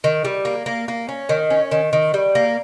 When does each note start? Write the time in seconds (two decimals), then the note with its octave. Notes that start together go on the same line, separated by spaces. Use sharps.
0.04 D#3
0.25 G3
0.45 A#3
0.66 A#3
0.88 A#3
1.09 C#4
1.29 D#3
1.50 C#4
1.71 D#3
1.93 D#3
2.14 G3
2.35 A#3